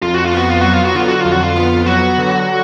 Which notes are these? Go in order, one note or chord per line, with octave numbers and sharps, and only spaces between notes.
F2 F4
F#4
F4
B3 F#4
F4
F#3 F#4
F4
F#4
D3 F4
F#4
F4
F2
F#4
F4
B3
F#3 F#4
D3